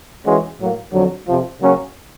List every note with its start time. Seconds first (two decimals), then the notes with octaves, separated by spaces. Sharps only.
0.26 E3 G#3 C#4 F#4
0.60 A2 F#3 A#3
0.93 F2 D3 F#3
1.28 F2 C3 F3
1.61 C#3 F#3 A#3 C#4